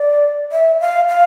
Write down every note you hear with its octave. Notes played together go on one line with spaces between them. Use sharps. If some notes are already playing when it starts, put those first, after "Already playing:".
Already playing: D5
E5
F5
F5